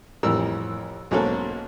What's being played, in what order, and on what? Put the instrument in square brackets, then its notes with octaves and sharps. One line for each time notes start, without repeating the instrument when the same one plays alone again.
[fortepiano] A1 F2 E3 G3 A#4 E6
B1 G#2 F#3 A#3 C#4 A4